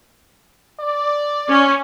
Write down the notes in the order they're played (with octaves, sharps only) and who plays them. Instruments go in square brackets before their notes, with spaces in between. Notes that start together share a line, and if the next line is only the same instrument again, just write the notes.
[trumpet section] D5
[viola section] C#4